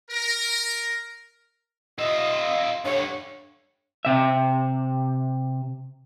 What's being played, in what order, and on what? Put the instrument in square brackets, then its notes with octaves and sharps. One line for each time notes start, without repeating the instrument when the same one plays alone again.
[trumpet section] A#4
[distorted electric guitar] F4 E5 [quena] D#5
[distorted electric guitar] G2 D3 [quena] C#5
[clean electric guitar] C3 E5